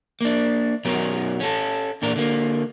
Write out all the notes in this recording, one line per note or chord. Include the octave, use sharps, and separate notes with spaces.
A#3 D4
B2 F#3 C#4 A#4
C#4 A4
E2 A#2 D4 A#4
D3 A#3